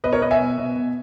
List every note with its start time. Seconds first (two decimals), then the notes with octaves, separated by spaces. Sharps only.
0.04 B2 B4 D#5
0.13 A#4 C#5
0.22 B2 B4 D#5
0.31 E5 G#5
0.40 B2
0.58 B2
0.76 B2